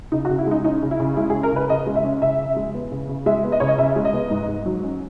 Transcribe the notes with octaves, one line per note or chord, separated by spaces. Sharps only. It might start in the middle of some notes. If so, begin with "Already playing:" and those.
C#3 D#4
F#4
C#3
E4
G#3 D#4
C#4 D#4
C#3
E4
C#3
G#3 E4
G#4
C#4
A#4
C#3 B4
C#3 D#5
G#3
E5
C#4
C#3 E5
C#3
G#3
B3
C#3
C#3
G#3 E5
B3
D#5
C#3 C#5
D#5
C#3 E5
G#3
D#5
B3
G#2
G#2
F#3
C#4